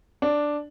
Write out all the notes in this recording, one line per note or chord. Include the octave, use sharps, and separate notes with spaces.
D4